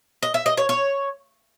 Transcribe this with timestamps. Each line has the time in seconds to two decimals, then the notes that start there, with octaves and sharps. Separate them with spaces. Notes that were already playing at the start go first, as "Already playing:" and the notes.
0.23 D#5
0.34 E5
0.46 D#5
0.57 C#5
0.69 C#5